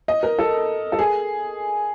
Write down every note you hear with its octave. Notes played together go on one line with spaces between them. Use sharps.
D#5
A#4
A4
A4
G#4